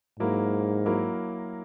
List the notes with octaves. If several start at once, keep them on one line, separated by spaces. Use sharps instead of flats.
G#2 F#3 A#3 E4 A#4
F#3 A#3 E4 A#4